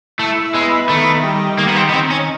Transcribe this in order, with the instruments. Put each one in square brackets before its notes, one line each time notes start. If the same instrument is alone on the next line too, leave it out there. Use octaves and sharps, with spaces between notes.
[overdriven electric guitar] A3 [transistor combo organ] E4
[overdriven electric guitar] G#3 [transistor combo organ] B3
[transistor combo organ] D#3 [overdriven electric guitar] A3
[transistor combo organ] G3
[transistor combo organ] D#3 [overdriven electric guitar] A#3
[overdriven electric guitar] B3
C4
B3
[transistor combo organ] D#3 [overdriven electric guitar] C4
[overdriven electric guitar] C#4